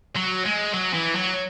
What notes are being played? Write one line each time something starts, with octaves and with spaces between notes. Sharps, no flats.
F#3
G#3
F#3
E3
F#3